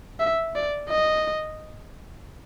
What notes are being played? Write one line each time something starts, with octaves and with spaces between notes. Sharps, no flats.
E5
D5
D#5